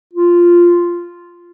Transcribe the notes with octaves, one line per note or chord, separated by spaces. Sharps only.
F4